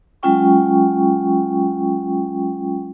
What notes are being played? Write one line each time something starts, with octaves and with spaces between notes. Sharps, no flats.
F#3 G#3 C#4 F4 G5 C#6